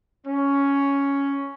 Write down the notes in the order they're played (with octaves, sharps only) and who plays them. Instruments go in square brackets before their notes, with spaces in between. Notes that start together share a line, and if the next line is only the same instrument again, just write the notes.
[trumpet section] C#4